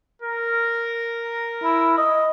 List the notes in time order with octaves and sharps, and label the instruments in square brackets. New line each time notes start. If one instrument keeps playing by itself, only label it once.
[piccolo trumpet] A#4
[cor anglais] E4
D#5